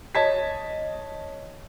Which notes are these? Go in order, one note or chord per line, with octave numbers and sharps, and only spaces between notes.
C#5 D#5 A5 G#6 B6